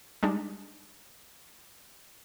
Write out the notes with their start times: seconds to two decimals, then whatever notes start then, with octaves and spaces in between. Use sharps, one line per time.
0.23 G3 G#3 D4 D#4